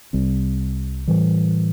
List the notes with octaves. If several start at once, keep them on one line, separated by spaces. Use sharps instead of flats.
C2 C3 G3 C4
A2 E3 G3